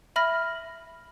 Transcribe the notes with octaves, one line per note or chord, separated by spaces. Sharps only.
E5 B5 F6 A#6